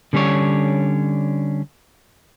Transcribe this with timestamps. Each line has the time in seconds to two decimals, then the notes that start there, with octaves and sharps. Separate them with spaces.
0.13 D3 G3 C#4 D4 C#5